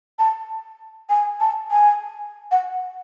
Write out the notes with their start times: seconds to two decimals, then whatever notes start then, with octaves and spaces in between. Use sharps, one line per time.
0.19 A5
1.10 G#5
1.40 A5
1.71 G#5
2.51 F#5